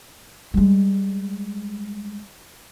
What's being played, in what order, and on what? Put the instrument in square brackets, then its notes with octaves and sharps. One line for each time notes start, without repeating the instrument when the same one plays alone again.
[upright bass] G3 G#3